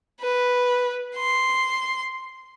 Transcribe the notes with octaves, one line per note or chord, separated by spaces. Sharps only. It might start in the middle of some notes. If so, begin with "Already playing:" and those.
B4
C6